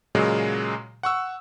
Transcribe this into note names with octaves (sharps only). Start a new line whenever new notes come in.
A#2 C#3 F#3 G#3
F#5 C#6 E6